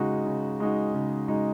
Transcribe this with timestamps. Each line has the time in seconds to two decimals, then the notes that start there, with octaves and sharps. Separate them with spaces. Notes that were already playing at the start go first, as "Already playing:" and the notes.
Already playing: C#3 G#3 D#4 F#4
0.26 C#3
0.60 G#3 D#4 F#4
0.94 C#3
1.28 G#3 D#4 F#4